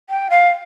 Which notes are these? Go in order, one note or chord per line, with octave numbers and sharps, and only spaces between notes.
G5
F5